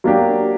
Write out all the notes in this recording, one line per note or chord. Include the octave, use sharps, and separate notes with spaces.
F#3 A#3 D4 G4